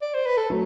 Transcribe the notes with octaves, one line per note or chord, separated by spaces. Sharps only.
D5
C5
B4
A4
F#3 A3